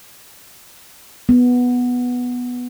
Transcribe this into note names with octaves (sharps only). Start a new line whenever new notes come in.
B3